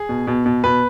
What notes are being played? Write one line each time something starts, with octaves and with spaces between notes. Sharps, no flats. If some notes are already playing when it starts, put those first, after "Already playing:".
Already playing: G#4
B2
B2
B2
B2 B4